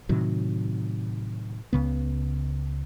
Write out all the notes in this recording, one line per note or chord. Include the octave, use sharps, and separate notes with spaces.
A2 C3 D#3 F#3
C#2 C#3 B3